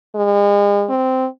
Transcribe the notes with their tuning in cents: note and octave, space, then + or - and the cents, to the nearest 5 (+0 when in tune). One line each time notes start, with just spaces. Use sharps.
G#3 -40
C4 -10